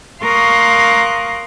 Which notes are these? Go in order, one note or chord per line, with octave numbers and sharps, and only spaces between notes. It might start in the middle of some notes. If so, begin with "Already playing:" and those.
A#4 F5 C6 C#6 D#6 F#6